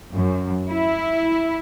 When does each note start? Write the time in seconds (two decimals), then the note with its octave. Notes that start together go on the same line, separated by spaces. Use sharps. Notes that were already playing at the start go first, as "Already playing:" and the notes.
0.12 F#2
0.68 E4